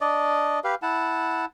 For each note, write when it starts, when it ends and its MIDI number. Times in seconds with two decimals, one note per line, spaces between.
0.01 0.60 62
0.01 0.60 74
0.01 0.60 75
0.64 0.75 67
0.64 0.75 71
0.64 0.75 77
0.82 1.45 64
0.82 1.45 78
0.82 1.45 81